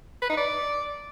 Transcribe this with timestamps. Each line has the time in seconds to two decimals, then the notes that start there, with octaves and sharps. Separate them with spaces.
0.22 B4
0.30 D#4
0.38 D5